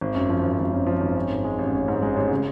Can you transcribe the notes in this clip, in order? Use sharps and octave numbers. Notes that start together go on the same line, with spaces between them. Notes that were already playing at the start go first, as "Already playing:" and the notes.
G#1
F#2
F3
G#1
G#1
F#2
F3
G#1
C#4
G#2
G#3
A1
C#4
G#2
G#3
A1
C#3